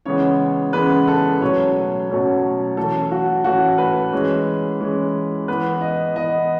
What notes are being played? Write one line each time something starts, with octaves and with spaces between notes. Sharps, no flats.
C#3 E3 G#3 B3 C#5
C#3 E3 G#3 B3 B4
A4
B2 F#3 A3 C#4 C#5
B2 F#3 A3 C#4
E3 A3 C#4 A4
F#4
E3 A3 C#4 F#4
B4
E3 G#3 C#4
E3 G#3 C#4
E3 B3 B4
D#5
E3 B3 D#5